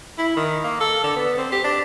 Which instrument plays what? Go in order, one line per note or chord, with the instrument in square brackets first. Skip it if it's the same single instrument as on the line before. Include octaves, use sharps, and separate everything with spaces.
[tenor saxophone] E4
D#3
A#3
A4
D3
B3
C4
G4
D4